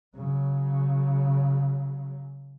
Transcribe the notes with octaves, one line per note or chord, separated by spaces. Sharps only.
C#3 F#3